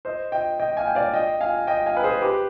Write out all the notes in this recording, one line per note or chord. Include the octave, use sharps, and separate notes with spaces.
C5 D#5
D#5 G5
D#5 G5
F5 G#5
G5
D5 F5
D#5 G5
F5 G#5
D#5 G5
F5 G#5
B4
G#4 C5
G4 B4